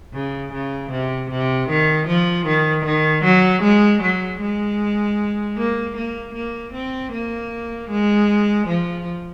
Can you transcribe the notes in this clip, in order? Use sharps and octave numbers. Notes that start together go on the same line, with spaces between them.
C#3
C#3
C3
C3
D#3
F3
D#3
D#3
F#3
G#3
F#3
G#3
A#3
A#3
A#3
C4
A#3
G#3
F3